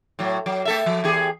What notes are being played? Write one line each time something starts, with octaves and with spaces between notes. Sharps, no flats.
A2 F#3
F#3
A3 A4 E5
F3
E2 G4 G#4